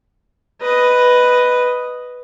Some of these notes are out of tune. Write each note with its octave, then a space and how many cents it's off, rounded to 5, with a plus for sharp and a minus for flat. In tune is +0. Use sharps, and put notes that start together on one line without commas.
B4 +0 D#5 +0